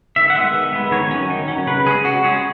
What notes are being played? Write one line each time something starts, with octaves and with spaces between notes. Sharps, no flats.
D#3 E5
F#5
G#3 B3 E5
D#3
G#3 B3
D#3 C#5
F#3 C#4
D#3
F#3 C#4
C#3 B4
G#3 C#4 G#4
C#3 F#4
G#3 C#4 G#4